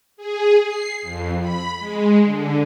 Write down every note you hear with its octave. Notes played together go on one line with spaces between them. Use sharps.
G#4
C7
F2
B5
G#3
D3